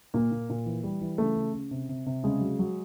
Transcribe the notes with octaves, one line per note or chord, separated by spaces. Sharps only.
A#2 A#3
A#2
A#2
E3
G3
E3
C#3 A3
C#3
C#3
C3
C3
C3
C#3 G#3
F#3
F#3